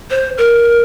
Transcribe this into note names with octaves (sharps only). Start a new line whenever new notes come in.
C5
A#4